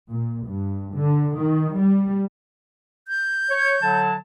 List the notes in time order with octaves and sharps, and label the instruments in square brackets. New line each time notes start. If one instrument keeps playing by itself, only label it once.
[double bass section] A#2
G2
D3
D#3
G3
[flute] G6
[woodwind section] C#5
D3 F#3 A5